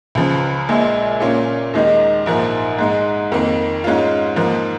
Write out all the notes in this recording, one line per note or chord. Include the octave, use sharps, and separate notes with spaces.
C#2 C#3 F3
A#1 A#2 G#3
A#2 A#3 C#4 F4
D#2 D#3 G#3 D#4
A#1 G#2 F3 A#3
G#2 G#3 D#4
F2 D#3 A#3
G#2 G#3 C#4 F4
G#2 F3 A#3